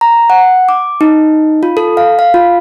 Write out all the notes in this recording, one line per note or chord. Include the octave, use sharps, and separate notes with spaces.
A#5
F#5
D6
D#4
F4
A4
F5
F5
F4